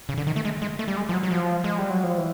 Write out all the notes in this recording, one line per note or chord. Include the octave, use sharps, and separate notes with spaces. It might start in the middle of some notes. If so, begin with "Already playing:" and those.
C#3
D3
D#3
A3
G#3
G#3
A3
G3
G#3
F3
F#3
F#3
F3
G#3
G3
F#3
F3
E3